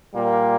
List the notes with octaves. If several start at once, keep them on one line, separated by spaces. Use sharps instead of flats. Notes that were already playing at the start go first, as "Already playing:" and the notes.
A#2 G3 A#3